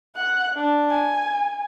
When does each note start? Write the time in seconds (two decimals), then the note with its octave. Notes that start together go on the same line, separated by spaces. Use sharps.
0.16 F#5 F#6
0.54 D4
0.90 G#5